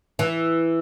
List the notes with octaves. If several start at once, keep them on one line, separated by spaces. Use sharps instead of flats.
E3